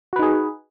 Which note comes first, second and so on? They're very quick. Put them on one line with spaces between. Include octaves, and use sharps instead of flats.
F#4 B4 D#4 G#4